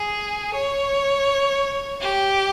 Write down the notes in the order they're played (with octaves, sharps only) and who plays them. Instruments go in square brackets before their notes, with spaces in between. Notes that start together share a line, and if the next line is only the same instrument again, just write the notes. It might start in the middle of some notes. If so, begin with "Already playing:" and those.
Already playing: [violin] G#4
C#5
G4